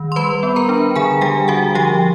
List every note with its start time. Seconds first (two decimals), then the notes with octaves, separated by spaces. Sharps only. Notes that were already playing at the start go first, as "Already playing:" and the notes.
Already playing: D#3
0.12 C6
0.16 G3 B4 B5
0.43 B3
0.56 A#4 A#5
0.69 D4
0.96 D3 G#4 G#5
1.21 G3 G4 G5
1.48 D3 F#4 F#5
1.75 F3 G4 G5